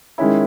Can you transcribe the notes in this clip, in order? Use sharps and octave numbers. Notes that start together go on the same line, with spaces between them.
D#3 G#3 C#4 E4